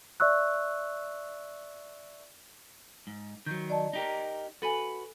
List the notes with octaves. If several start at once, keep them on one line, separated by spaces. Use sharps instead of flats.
D5 E5 C#6 E6 F#6
G#2
D#3 F#3 G6
D5 D#5 A5
D#4 G4 A#4
F#4 A4 B4 G#5